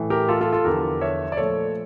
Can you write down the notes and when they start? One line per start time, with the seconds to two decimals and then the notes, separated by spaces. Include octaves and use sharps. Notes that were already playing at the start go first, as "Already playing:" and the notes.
Already playing: A2 E3 A3
0.10 G4 A#4
0.29 F4 A4
0.41 F4 A4
0.53 F4 A4
0.65 E2 D3 F3 G4 A#4
1.01 C#5 E5
1.32 D5
1.37 A#2 F3 A3 A4 C#5